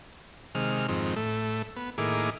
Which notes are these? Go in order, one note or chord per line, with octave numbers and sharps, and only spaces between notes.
C3 D#3 G#3 F6
F2 G#2 D#3 C4
A2 A3
B3
A2 D#3 A#3 E4 G#4 D6